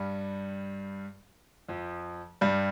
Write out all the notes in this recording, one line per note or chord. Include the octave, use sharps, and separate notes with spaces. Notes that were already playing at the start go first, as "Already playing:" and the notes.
Already playing: G2 G3
F2 F3
G2 G3